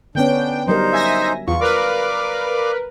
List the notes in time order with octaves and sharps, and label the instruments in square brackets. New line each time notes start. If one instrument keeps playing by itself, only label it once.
[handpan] D3 B3 C#4 [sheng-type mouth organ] D4 [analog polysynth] G5
[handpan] F#3 G3 A#4 [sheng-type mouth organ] D#4 C5
[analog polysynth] E5 G#5 A#6
[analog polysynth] E2 [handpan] F4 [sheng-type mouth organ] C#6
[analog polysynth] A#4 B4 [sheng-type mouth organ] D5 F5 D6